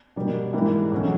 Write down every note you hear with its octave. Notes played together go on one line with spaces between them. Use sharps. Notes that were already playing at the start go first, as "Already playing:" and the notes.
B2 G3 A#3
G#2 E3 G3 A#3
E2 B2 F#3 A3 C#4